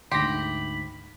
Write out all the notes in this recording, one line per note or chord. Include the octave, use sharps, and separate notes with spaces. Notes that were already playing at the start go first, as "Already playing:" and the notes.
D2 G#2 G4 B5 C6 A#6